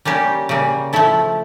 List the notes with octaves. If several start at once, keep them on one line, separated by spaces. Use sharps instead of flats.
G3 A#3 C#4 G4
C#3 G3 A#3
F3 A3 E4 A4